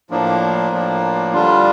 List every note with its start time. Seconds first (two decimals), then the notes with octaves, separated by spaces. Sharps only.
0.11 A2 F3 A#3 D4
0.72 A2 F3 A#3 D4
1.33 D3 G3 D4 F4